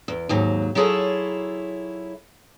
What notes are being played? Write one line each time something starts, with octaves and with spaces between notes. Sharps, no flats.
E2
D#2 G#2 F#3
F#3 E4 F4 G#4 A4 C#5